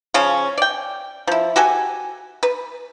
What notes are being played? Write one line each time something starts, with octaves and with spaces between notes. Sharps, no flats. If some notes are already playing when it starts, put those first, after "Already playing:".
C#3 F3 C#4
D5 G5
F3 E4
F#4 G4 A4 G#5
B4